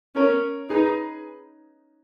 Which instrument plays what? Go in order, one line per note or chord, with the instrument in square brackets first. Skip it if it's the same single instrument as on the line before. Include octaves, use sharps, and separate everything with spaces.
[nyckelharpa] C#4 [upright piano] A#4 C#5
[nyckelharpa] D#4 [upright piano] G#4 B4